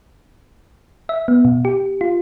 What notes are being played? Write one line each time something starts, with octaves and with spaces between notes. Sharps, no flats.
E5
B3
B2
G4
F4